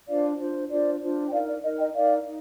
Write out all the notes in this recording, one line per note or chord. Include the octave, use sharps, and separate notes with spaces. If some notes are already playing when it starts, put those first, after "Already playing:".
D4 F4 C5 D5 F5
D4 F4 C5
D4 F4 C5 D5
D4 F4 C5
G5
D#4 A#4 D5 F5
D5
D#4 A#4 D#5
D#5 G5
D#4 A#4 D5 F5
D#4